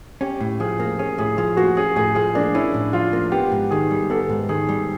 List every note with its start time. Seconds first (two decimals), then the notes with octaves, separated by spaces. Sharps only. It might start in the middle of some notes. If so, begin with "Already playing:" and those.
0.21 C#4 G4
0.40 A2
0.60 F3 G#4
0.80 A#3
0.99 C#4 G#4
1.18 A2 G#4
1.37 F3 G#4
1.57 A#3 F#4
1.77 C#4 G#4
1.96 A2 G#4
2.15 F3 G#4
2.35 A#3 D4
2.55 C#4 E4
2.74 A2
2.93 F3 F4
3.13 A#3
3.32 B3 G4
3.52 G#2
3.71 D#3 G#4
3.91 G3
4.10 B3 A4
4.29 G#2
4.49 D#3 G#4
4.69 G3